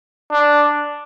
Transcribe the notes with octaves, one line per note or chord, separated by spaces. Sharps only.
D4